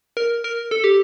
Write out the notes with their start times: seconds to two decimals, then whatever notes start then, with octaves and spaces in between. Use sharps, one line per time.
0.17 A#4
0.44 A#4
0.71 A4
0.84 G4